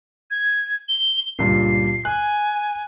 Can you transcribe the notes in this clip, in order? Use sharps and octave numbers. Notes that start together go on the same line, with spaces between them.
G#6
G7
C#2 G2 A#2 C7
G#5 F#6